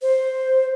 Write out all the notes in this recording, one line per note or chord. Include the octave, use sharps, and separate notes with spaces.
C5